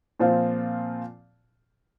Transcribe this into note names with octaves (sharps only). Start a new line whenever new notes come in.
A#2 F3 C4 F4